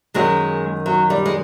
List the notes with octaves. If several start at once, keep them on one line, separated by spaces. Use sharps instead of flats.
F#2 D#3 F#3 G#3
F#3
G3
G#3